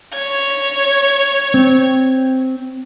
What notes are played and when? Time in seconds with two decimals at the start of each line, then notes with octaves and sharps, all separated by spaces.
0.14 C#5 G#6
1.54 C4